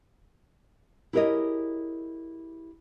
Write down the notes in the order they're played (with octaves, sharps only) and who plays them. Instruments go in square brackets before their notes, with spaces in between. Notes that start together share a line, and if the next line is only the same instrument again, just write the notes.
[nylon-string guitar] E4 G4 G#4 A#4 C#5 D#5